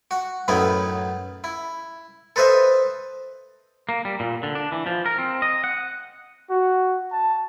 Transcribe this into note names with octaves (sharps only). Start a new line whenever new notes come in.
F#4
F#2 A2 B3 D#4 E4
E4
A4 B4 C5 D#5 E5
A#3
G3
A#2
D3
D4
E3
F3
A#4
C4
D#5
F#5
F#4
A5